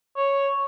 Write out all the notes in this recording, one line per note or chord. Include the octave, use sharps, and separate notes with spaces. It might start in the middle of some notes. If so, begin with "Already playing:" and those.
C#5